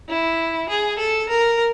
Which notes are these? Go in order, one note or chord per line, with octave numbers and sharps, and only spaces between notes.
E4
G#4
A4
A#4